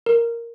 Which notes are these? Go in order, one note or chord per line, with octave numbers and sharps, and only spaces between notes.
A#4